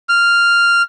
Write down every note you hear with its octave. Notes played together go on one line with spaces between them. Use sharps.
F6